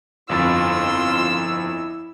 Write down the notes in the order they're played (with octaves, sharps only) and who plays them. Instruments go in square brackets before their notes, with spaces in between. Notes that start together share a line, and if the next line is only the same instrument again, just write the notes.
[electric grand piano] G1 F2 A6 [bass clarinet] E4 [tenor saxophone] F4 [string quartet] E6